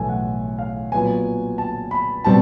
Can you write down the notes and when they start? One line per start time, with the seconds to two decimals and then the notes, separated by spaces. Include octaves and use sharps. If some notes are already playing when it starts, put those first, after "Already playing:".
Already playing: B1 A2 E3 A3 G#5
0.09 F#5
0.59 F5
0.92 A#2 F#3 B3 G#5
1.58 A5
1.91 B5
2.24 B2 G3 C4 A5